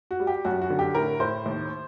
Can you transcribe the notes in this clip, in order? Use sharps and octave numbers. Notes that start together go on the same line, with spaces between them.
F#4
G3
G4
F#2 F#4
F#4
D3
G4
A2 A#4
A2 C5
D#2